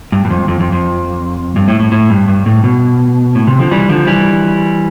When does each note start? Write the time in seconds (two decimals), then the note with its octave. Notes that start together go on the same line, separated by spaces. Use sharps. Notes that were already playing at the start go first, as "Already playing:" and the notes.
0.12 G2
0.25 G2
0.30 F2
0.48 F2
0.60 F2
0.72 F2
1.56 G2
1.68 A2
1.80 A2
1.92 A2
2.10 G2
2.28 G2
2.46 A2
2.64 B2
3.35 A2
3.47 C3
3.59 D3 F3
3.71 E3 G3
3.89 D3 F3
4.07 E3 G3